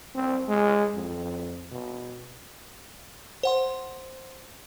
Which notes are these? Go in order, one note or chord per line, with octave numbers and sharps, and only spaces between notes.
C4
G#3
F2
B2
C5 F#5 C6